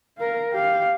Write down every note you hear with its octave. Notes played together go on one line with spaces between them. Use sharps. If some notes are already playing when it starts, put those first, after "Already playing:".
A#4 F5
G4 F5